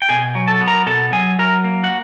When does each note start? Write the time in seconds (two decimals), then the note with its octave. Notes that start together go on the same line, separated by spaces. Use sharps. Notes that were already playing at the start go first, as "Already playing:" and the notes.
0.02 G5
0.09 B2 G#4 G#5
0.35 F#3
0.48 A4 A5
0.61 B3
0.67 A#4 A#5
0.86 B2 A4 A5
1.12 F#3 G#4 G#5
1.39 F#3 A#4 A#5
1.64 A#3
1.83 F#4 F#5